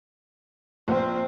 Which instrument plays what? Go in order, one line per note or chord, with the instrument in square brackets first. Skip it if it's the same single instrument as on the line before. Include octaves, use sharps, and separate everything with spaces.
[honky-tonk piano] A#1 [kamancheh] C4 C5